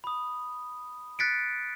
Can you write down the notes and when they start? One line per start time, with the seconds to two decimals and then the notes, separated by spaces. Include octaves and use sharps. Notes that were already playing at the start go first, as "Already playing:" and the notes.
0.04 B5 D#6
1.19 F#6 A6 B6 C#7 D7